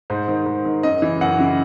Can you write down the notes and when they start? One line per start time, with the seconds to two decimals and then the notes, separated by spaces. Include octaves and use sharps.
0.10 G#2 C5
0.28 D#3
0.46 G#2
0.65 D#3
0.83 F#2 D#5
1.02 C#3 E3
1.21 F#2 F#5
1.39 C#3 E3